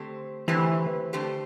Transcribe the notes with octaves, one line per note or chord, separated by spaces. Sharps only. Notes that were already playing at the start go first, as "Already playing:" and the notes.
Already playing: D3 A3 C4 G4 C5
D3 E3 A3 C4 G4 C5
D3 A3 C4 G4 C5